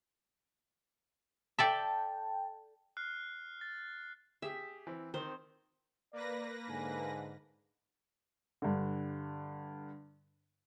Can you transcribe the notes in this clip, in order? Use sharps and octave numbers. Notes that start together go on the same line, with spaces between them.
A4 D5 E5 G5 A5
F6 F#6 C7
A6
G4 G#4 E5
E3 C4
D#3 C4 C5
A#3 B4 D5 A#6
G#2 D3 G#5
G2 D3